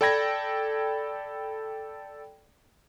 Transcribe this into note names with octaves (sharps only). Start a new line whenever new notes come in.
A4 D5 G5 B5 G#6 A#6